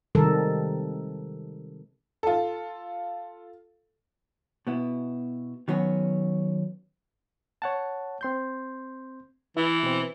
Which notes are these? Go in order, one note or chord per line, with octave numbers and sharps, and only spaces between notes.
C3 D#3 G3 G#3 A4 A#4
F4 A4
B2 B3 E4
D#3 F#3 B3 C#4
C#5 F#5 A5
C4 C6 G6
E3 E4
B2 C4